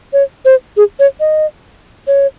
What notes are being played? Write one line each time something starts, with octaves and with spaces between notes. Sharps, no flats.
C#5
C5
G#4
C#5
D#5
C#5